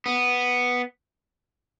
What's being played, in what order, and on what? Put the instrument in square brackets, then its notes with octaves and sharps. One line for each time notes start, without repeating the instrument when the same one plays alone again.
[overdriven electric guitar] B3